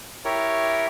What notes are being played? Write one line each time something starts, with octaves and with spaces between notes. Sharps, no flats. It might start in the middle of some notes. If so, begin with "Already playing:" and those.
E4 G4 A#4 C#5